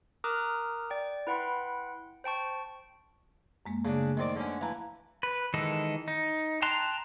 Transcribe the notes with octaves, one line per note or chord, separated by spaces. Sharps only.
A#4 A#5 D6 D#6 F6 F#6
D5 G5
E4 B4 F#5 G5 B5 C6
C5 G5 A5 C#6
F#2 G#3 A#3
C#3 A3 D4
D#3 C4 D5
D3 C#4
E3 F5 A5 A#5
B4
D#3 E3 G#3 D#4 A4
D#4
G5 A5 A#5 C6 F#6